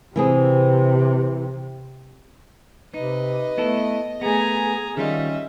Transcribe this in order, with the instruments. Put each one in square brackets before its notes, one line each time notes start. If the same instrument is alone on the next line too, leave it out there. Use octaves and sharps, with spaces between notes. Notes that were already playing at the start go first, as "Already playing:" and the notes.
[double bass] C3 [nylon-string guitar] E3 C4 G#4
[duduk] C3 [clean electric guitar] D#4 [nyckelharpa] B4 [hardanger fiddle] D#5
[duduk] A3 [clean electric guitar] B3 E4 A4
[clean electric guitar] A3 B3 [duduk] G#4 [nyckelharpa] G#5 A#5
[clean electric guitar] D#3 G3 F4 [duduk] C#4 [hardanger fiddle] D#5 [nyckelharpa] E5